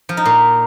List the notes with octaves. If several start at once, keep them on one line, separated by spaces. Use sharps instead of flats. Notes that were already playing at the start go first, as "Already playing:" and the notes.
F3
D#4
A#2